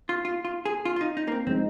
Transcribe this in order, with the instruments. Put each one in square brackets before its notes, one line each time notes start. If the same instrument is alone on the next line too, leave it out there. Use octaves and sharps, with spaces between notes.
[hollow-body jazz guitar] F4
F4
F4
G#4
F4
F4
D#4
D#4
A#3
C4
[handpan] F3 G#3 D#4 [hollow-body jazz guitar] C4